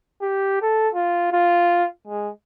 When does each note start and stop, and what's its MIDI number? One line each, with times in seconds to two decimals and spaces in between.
0.21 0.60 67
0.62 0.89 69
0.95 1.32 65
1.33 1.87 65
2.07 2.30 56